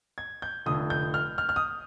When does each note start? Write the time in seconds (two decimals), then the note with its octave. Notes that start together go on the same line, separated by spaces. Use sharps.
0.18 G#6
0.42 G6
0.66 F1 F2 D3 D#6
0.90 G6
1.14 F6
1.38 F6
1.49 F6
1.56 D#6